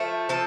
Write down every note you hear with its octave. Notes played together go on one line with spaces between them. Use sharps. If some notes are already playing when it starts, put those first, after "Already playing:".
Already playing: F3 A3
F3 A4